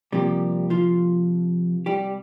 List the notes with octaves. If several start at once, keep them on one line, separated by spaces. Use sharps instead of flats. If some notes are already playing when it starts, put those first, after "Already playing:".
C3 F3 G3 A#3 G4
F3 F4
G3 G4